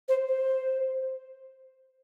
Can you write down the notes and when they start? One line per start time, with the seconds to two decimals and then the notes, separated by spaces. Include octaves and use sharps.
0.09 C5
0.28 C5